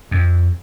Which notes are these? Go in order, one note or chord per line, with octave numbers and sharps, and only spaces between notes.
F2